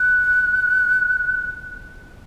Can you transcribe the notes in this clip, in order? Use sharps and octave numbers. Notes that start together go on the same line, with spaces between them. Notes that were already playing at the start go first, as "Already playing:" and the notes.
Already playing: F#6